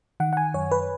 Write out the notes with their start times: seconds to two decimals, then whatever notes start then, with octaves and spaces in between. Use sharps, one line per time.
0.20 D#3 F#5
0.33 F#5
0.37 G#5
0.54 F#2 C#5
0.72 B4